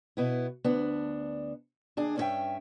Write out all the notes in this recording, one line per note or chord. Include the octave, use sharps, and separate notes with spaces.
B2 B3 E4
D2 B3 D4
D#2 D4 G#4
G2 C#4 E4 B4 E5 G5